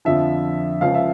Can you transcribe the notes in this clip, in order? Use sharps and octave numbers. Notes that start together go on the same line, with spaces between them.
F2 D3 F3 E5
C#2 C#3 F3 F5
E5